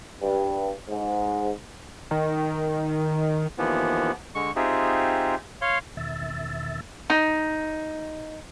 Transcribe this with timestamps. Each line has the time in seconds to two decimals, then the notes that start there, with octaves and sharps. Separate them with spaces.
0.21 G2
0.89 G#2
2.11 D#3
3.58 D#2 E3 F3 B3
4.35 D3 G#3 C#6
4.56 C4 D#4 F4 G4 G#4 E5
5.62 C#5 F5 C6
5.97 E2 B2 D#3 E5 E6 A6
7.10 D#4